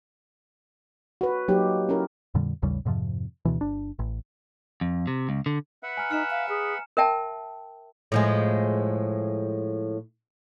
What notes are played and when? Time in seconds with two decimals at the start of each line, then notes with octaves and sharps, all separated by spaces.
1.21 F#4 B4
1.48 F#3 A#3 D#4 G4
1.89 C#4 E4 A#4
2.35 F2 A#2 D3 G3
2.62 A1 D#2 C#3 G3
2.85 F2 G#2 C3 F3
3.45 D2 B2 E3
3.61 G1 D4
3.99 A1
4.81 F2
5.07 C3
5.29 C#2
5.46 D3
5.83 B4 E5 F#5
5.97 G#5 A#5 F6
6.11 D#4 F6 C#7 E7
6.30 F5
6.49 G#4
6.97 A#4 E5 G5 A5
8.12 A2 F3 G#3